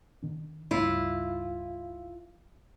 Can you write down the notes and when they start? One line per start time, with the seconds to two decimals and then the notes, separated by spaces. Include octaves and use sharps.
0.23 D#3 D4
0.71 C#2 G2 E4 F4